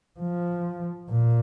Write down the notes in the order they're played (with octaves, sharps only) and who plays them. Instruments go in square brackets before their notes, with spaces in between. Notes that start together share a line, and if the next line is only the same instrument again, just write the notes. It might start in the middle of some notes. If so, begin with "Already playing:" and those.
[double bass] F3
A#2